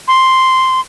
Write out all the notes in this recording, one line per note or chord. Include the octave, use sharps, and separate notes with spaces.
C6